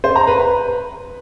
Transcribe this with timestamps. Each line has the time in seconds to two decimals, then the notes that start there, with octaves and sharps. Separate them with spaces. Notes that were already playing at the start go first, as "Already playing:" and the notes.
0.04 C5
0.16 A#5
0.27 B4
0.39 B4